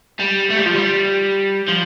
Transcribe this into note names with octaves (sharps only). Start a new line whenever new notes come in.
G3
A3
G3
F3
G3
F3